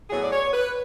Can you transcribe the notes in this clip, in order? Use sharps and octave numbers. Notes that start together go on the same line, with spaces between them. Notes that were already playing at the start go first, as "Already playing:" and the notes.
A2 F#3 B3 G#4
D5
C#5
B4